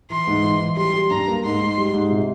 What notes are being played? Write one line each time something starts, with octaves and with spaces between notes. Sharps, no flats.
E3 C6
G#2
E3
E3
G3 C6
G3
G2 A#5
A#3
G#2 C6
G#2
G3
G#2
C3